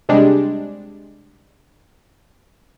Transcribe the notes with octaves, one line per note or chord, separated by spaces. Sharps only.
C3 G3 G#3 D4